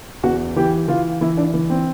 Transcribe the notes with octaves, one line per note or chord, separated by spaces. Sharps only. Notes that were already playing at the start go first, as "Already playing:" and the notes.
E2 F#4
E3 G4
E3 F4
E3 E4
D4
E3
C4